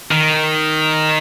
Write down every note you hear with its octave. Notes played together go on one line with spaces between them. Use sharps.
D#3